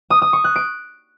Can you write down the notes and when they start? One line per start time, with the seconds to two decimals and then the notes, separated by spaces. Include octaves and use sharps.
0.10 D#6
0.22 D#6
0.33 C#6
0.44 F#6
0.56 D7